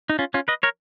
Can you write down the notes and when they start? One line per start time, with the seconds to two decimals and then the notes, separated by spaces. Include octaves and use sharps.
0.10 D#4
0.19 C#4 F4
0.34 C#4 F4
0.48 B4 D#5
0.63 A#4 C#5